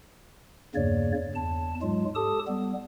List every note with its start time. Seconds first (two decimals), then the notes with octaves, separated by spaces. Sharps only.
0.75 E2 G2 C#3 A#3 C#5 D5
1.35 E2 A5
1.82 G#2 F#3 G#3 F4
2.15 G4 A4 A5 D#6
2.47 G3 B3